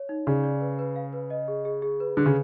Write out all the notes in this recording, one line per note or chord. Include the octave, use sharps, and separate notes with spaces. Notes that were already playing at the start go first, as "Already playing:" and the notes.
Already playing: C#5
D#4
C#3 D5
D5
B4
B4
F5
B4
D#5
G#4
G#4
G#4
B4
D3 G#4
C#3